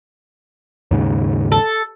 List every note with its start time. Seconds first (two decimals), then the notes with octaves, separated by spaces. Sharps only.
0.91 D#2 G#2 C#3
1.52 A4